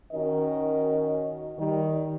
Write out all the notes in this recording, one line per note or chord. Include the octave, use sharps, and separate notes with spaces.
D#3 C#4 D#4 F#4 A#4 D#5
D#3 G3 D#4